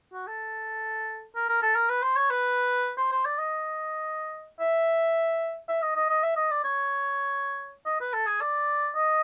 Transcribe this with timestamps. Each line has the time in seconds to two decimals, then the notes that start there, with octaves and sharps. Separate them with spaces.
0.13 F#4
0.27 A4
1.36 A#4
1.49 A#4
1.62 A4
1.75 A#4
1.89 B4
2.03 C5
2.16 C#5
2.30 B4
2.98 C5
3.12 C5
3.25 D5
3.38 D#5
4.60 E5
5.69 E5
5.82 D#5
5.96 D#5
6.10 D#5
6.23 E5
6.37 D#5
6.51 D5
6.64 C#5
7.86 D#5
8.01 B4
8.14 A4
8.27 G#4
8.41 D5
8.95 D#5